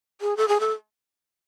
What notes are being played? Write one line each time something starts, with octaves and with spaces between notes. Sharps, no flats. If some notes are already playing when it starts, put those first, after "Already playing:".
G#4
A4
G#4
A4